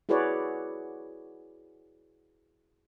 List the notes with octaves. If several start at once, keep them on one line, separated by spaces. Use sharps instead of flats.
E4 F#4 G#4 B4 C#5 D5